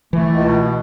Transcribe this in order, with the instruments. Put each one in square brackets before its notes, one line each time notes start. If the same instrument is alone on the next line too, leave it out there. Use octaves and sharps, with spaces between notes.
[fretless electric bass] E3 [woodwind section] A3
[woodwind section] C#2
B2